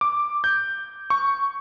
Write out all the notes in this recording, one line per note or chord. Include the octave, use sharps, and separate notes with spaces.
D6
G6
C#6